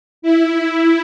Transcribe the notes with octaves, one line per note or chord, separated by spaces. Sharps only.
E4